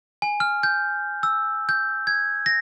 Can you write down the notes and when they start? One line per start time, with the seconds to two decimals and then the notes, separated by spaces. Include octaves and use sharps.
0.22 G#5
0.40 F6
0.63 G6
1.23 E6
1.69 G6
2.07 G#6
2.46 A#6